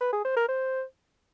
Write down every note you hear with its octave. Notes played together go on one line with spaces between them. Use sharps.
B4
G#4
C5
A#4
C5